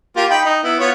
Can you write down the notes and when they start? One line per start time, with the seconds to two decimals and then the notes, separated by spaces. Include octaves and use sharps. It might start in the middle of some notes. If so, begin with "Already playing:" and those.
0.16 A#3 F4 G4
0.30 D#4 G5 B5
0.45 D#4
0.63 B3 E4
0.80 B3 F4 C#5